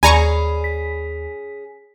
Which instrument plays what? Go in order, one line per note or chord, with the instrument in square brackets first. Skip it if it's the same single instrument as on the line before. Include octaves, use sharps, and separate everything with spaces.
[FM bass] D#2 [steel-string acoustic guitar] C#4 G#4 [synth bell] D5 B5 [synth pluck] G#5 A#5 C#6
[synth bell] B6